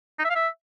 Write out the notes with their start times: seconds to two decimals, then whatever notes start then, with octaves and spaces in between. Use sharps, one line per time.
0.19 D#4
0.25 E5
0.30 F5
0.35 E5